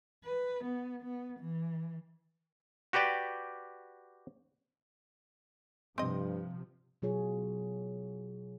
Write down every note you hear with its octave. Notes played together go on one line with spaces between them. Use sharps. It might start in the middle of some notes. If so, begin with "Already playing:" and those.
B4
B3
B3
E3
F#4 G4 B4 D5 G5
G2 C3 F3 C4 D#5
B2 F#3 F4 G#4 C#5